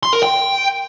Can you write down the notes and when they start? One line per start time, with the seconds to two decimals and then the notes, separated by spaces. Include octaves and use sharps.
0.03 C6
0.13 A#4
0.23 G5